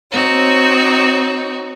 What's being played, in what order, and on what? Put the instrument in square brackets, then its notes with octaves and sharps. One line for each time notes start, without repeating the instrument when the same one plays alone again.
[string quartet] C4 D#4 F#4 C#5